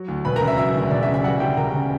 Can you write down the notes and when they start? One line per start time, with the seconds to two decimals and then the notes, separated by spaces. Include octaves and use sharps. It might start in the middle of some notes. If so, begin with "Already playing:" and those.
Already playing: F#3
0.08 D2
0.25 E1 B4 B5
0.36 A#4 A#5
0.42 C#3
0.47 E5
0.58 F#3 E5
0.74 D2
0.91 E1 D5
1.03 E5
1.07 C#3
1.14 E5
1.24 G3 F#4 F#5
1.40 D2 G4 G5
1.57 E1 A#4 A#5
1.74 C#3